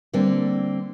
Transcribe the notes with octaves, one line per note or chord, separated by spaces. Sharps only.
D3 G3 A#3 C4